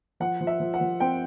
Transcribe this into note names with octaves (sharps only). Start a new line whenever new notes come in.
F3 F#5
F3
E5
F3
F#5
F3
C4 G5